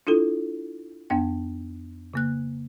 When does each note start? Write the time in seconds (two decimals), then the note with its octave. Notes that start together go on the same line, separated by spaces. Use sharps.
0.07 D4 E4 F4 A4
1.10 F2 B3 D4 G5
2.13 C#3 A#3 F#6